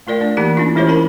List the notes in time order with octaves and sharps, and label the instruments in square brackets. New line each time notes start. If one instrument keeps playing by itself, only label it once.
[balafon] A3 F4 A#4 D5 G5
A3 D4 D5
E3 A#3 D#4 G4 A5
C#4 D4 E4 F4
E3 G#3 E4 G4 C5 C#5
C#4 F4 A#4 A5 B5